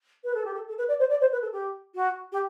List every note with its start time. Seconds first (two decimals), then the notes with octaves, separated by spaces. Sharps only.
0.24 B4
0.34 A4
0.45 G4
0.54 A4
0.67 A4
0.78 B4
0.88 D5
0.99 C5
1.09 D5
1.21 C5
1.31 B4
1.41 A4
1.52 G4
1.94 F#4
2.32 G4